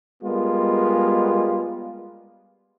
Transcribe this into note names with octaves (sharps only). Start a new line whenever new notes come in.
G3 G#3 A#3 B3 F4